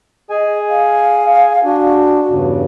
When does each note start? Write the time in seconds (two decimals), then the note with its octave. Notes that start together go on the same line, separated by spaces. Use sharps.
0.30 G#4 D#5 G#5
0.70 F5
1.64 D4 F#4
2.29 E2 G2 C#3